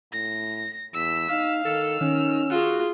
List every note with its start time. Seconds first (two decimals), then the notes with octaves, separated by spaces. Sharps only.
0.13 A2 A#6
0.93 E2 E6 B6
1.29 D#4 F5
1.65 D#3 A4 E6 F6
2.01 D#3 C#4
2.50 F4 F#4 G#4